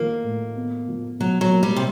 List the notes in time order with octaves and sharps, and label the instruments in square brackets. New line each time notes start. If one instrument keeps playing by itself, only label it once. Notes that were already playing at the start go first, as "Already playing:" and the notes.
Already playing: [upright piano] D#3 F3 [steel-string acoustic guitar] A#3
[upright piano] A2
B3
F3
[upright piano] B2 [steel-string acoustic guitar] F#3
[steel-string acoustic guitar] F#3
[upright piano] A#3
[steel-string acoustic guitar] G3
C3